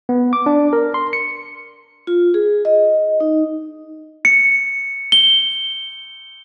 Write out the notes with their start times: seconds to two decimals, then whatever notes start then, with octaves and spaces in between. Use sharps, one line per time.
0.09 B3
0.33 D6
0.46 D4
0.73 A#4
0.94 C6
1.13 C#7
2.07 F4
2.34 G#4
2.65 D#5
3.20 D#4
4.25 C#7
5.12 G7